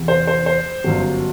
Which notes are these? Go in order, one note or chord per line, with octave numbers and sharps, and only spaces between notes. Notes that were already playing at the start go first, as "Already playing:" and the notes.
Already playing: E2 C3 E3
C5
C5
C5
G1 F#2 F#3